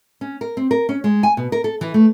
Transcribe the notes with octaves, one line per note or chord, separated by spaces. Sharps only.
C#4
A#4
C4
A#4
C#4
G#3
G#5
B2
A#4
A4
E3
A3